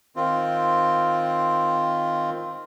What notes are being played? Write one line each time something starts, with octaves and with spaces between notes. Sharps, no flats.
D#3 C4 F4